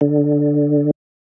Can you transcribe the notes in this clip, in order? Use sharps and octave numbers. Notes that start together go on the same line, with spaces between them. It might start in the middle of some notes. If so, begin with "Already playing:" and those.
D3